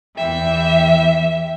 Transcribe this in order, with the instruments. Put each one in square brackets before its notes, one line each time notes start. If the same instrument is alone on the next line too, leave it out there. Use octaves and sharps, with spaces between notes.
[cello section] E2 E3 [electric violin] E5 [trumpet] G5